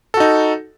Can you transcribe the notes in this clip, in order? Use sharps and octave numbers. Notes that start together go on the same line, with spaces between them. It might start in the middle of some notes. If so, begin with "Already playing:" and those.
D#4 F#4 A4